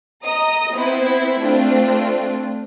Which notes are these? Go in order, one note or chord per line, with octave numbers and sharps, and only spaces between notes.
D#5 A#5 D#6
B3 C4 E4 C5
A3 C4 D4 F4